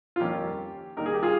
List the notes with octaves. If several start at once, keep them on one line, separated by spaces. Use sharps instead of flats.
F4
F2 D#3 G3 A#3 C#4 G4
D#3 G3 A#3 D#4 A#4
G#4
G4
F4 G#4